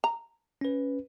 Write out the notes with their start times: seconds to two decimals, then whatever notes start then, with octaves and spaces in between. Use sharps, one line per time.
0.04 A#5
0.61 C#4 B4